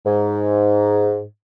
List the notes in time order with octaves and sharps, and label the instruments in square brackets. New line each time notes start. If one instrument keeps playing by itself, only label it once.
[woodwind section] G#2